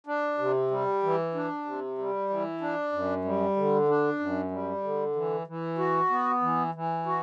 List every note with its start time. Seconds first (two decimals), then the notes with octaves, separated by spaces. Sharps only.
0.07 D4
0.38 C3
0.71 G3
1.03 E3
1.35 D4
1.65 C3
1.98 G3
2.30 E3
2.61 D4
2.92 F#2
3.25 G3
3.57 D3
3.88 D4
4.19 F#2
4.51 G3
4.84 D3
5.16 E3
5.47 E3
5.78 F#4
6.10 B3
6.42 E3
6.75 E3
7.06 F#4